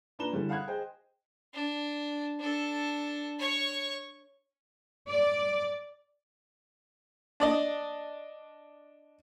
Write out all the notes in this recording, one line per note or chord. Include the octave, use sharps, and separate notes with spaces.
A#2 D4 B4 A#5 E7 G7
D3 E3 G3 C#4
F5 F#5 B5 D#6 F#6 G#6
G#4 C5 D#5 G5
D4
D4 A4
C#5 C#6
D5
D4 D5 D#5